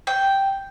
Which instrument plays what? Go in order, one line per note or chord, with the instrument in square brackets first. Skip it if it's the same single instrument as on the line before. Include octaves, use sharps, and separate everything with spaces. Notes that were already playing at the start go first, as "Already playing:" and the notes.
[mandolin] G5